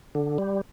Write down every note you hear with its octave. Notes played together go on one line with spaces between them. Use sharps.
D3
G3